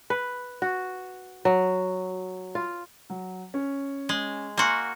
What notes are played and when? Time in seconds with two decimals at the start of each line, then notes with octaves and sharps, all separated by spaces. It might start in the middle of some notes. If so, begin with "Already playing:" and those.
0.10 B4
0.62 F#4
1.45 F#3
2.55 F4
3.10 F#3
3.54 C#4
4.09 G#3
4.57 A#3 F#4 G#5 C6 C#6